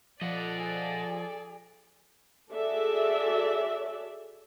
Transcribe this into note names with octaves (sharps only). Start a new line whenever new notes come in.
F3 A4 D5 D#5 F#5
G#4
F#4 G#4 A4 D5 E5